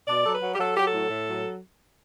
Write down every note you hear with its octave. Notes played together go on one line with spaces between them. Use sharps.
B2 D5
F#3 A4
B4
F#3
G4
F#3 A4
F#3 G4
A4
A2
A2
F#3